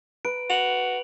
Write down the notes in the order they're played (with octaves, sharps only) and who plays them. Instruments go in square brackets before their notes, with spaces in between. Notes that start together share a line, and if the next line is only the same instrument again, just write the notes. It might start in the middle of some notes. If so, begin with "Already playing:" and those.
[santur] B4 [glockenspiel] D7
[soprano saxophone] F#4 [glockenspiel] F7 F#7